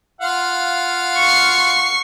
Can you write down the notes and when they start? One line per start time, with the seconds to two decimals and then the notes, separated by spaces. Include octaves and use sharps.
0.21 F4 F5 F#5
1.16 C#6 C7